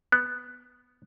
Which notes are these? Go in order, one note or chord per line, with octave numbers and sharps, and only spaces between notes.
B3